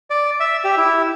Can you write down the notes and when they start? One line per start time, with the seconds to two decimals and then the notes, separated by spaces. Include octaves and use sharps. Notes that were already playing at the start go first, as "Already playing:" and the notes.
0.10 D5
0.40 E5
0.65 G4
0.77 E4